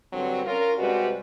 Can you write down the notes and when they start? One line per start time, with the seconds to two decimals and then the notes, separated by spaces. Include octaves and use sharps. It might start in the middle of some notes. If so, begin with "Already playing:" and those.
0.13 G2 D3 F#3 G3 C4
0.46 C#4 F4 A#4
0.78 C3 G3 G#3 F#4 B4 D5